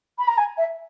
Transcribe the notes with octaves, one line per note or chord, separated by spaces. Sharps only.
B5
A#5
G#5
E5